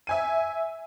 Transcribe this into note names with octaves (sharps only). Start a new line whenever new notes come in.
E5 G#5 D#7